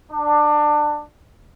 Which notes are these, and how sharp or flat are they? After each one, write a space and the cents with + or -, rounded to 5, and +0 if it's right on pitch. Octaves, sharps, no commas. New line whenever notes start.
D4 +20